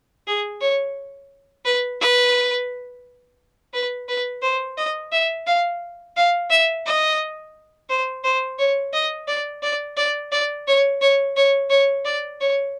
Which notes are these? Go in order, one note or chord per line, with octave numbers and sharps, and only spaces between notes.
G#4
C#5
B4
B4
B4
B4
C5
D#5
E5
F5
F5
E5
D#5
C5
C5
C#5
D#5
D5
D5
D5
D5
C#5
C#5
C#5
C#5
D5
C#5